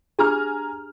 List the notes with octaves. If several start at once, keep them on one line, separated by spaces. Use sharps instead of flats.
D4 G4 G#4 G#5 A#5 F6